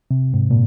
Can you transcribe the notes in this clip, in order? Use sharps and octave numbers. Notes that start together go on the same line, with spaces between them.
C3
G#2
A#2